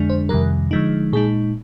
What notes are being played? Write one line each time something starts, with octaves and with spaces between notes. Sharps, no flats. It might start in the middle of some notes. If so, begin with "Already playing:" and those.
Already playing: F2 D3 G#3 D4
C5
F2 C3 D#3 G3 A#4
D3 F3 G#3 D#4
A#2 G#3 D#4 G#4